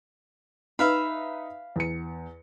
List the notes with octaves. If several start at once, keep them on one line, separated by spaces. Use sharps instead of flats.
D#4 B4 E5 F5 B5
E2 C#7